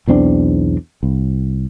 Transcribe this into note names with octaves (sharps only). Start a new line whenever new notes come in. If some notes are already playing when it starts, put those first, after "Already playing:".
B1 E2 C4 D4
C2